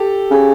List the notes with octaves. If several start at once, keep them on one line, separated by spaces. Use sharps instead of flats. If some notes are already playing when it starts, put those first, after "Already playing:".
Already playing: G4 A4
C#3